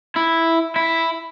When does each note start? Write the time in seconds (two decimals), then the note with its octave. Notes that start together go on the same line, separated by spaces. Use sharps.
0.16 E4
0.76 E4